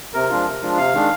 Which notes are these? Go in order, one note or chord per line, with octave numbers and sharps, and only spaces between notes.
C3 A#4
F3 G#3 D4 F4
C3
F3 G#3 D4 F4
C3 F5
D#3 G#3 D4